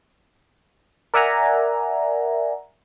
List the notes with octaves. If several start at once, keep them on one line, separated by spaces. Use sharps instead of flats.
A#4 D5 E5 F#5 G#5 A#5